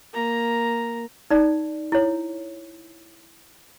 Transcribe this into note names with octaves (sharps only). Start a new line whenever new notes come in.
A#3 A#5
D#4 D5
E4 C#5